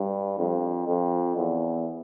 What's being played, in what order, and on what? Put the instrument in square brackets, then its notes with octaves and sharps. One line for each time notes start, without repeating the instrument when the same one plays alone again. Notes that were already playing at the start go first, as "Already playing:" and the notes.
Already playing: [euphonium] G2
F2
F2
E2